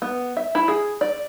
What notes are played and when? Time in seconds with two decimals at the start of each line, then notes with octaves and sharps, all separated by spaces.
0.02 B3
0.37 E5
0.55 E4
0.68 G#4
1.01 D5